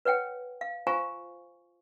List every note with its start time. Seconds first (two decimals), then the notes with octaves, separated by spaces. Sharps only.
0.05 B4 C#5 F#5 G5
0.61 F5
0.87 F4 C5 F5 G#5 A#5 C#6